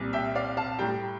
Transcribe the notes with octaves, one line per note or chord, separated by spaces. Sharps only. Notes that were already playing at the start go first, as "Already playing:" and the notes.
Already playing: C2 A#2 G3
E5 G5
D5 F5
F5 A5
A2 G3 G5 A#5